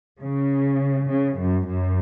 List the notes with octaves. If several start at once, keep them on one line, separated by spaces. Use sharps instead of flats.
C#3
C#3
F#2
F#2